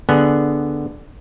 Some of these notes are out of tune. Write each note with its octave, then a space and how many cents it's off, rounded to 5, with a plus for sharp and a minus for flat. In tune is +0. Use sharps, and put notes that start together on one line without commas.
D3 +0 B3 +0 G#4 +0